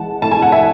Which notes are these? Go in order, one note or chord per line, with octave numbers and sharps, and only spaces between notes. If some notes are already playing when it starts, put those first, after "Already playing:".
Already playing: E3 G#3 F#5 A5
A2 A5
G#5
F#5
E5 G#5